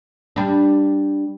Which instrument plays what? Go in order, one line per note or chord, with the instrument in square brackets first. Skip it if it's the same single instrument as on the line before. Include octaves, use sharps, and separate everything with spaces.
[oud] G3 D4